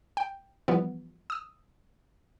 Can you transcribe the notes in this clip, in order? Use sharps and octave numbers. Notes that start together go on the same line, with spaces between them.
G5
E3 F3 G3 B3
D#6 E6